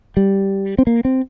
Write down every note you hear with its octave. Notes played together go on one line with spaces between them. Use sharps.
G3
C4
A#3
C4